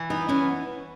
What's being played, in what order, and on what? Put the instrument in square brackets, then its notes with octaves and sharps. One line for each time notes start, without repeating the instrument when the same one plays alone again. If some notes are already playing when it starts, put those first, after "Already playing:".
Already playing: [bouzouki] E3
[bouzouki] B3 [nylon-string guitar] D#4
[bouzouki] E3 [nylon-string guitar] C#4